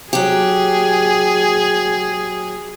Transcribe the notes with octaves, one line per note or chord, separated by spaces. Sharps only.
F#3 G4 G#4